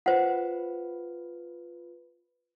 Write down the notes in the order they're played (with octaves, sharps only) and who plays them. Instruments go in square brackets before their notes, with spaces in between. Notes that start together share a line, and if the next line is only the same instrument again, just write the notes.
[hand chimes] F4 B4 [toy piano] C5 F#5